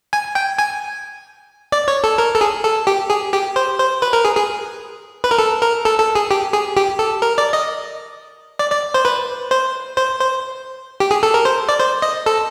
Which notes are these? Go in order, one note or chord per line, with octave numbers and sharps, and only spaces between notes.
G#5
G5
G#5
D5
C#5
A4
A#4
A4
G#4
A4
G4
G#4
G4
C5
C5
B4
A#4
G#4
G#4
B4
A#4
A4
A#4
A4
A4
G#4
G4
G#4
G4
A4
A#4
D5
D#5
D5
D5
C5
B4
C5
C5
C5
G4
G#4
A4
A#4
C5
D5
C5
D#5
A4